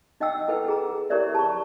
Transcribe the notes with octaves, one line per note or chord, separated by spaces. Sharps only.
D#4 D#5 F#5 G5 E6
E4 A4 B4 F#5 G5
G#4 A#5
E4 G4 A#4 C#5 D5 E5
A5 A#5 C#6